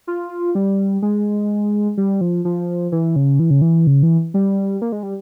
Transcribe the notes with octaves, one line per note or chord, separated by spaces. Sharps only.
F4
G3
G#3
G3
F3
F3
E3
C#3
E3
C#3
E3
C#3
E3
G3
A#3
G#3
G3